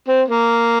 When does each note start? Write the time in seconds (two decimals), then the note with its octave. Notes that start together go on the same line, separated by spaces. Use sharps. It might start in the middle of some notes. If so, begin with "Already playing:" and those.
0.08 C4
0.28 A#3